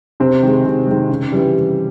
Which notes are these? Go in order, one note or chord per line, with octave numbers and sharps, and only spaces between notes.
C3 C4
D#3 G#3
C3
D#3 G#3
C#3
E3 G3